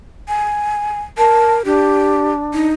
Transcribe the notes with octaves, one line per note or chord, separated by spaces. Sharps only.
G#5
A#4 A5
D4 G4
D#4